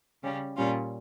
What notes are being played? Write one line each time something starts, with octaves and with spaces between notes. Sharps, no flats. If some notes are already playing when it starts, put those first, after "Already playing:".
C#3 G3 C#4
A#2 G3 C#4 F4